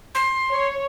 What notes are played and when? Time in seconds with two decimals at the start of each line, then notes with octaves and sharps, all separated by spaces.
0.15 C6
0.51 C#5